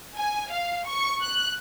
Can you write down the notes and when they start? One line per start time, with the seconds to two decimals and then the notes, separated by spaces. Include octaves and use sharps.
0.16 G#5
0.53 F5
0.87 C#6
1.22 F#6